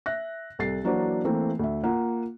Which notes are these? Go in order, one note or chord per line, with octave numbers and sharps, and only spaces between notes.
E5 F#6 A#6
C2 A4 A6 C7
E3 F#3 A#3 D4 F#4 C5
E3 A3 A#3 C4
D2 E5
A#3 F4 F#5